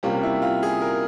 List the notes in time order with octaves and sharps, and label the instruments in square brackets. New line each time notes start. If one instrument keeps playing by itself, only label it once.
[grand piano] C3 G3 A#3 C#4 F4
E4
F4
G#4
A#4